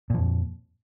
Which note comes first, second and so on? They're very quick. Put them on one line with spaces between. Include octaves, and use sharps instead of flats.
A#2 F3 F2